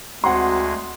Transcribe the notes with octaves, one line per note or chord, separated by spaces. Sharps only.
D2 G#3 C4 F#4 F#5 C6